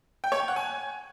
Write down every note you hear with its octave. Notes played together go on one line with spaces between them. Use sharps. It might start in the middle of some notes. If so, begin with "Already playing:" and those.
G5
C#5
G5
F#5
G#5